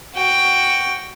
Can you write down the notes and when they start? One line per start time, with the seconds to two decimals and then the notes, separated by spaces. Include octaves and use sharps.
0.16 F#4 G5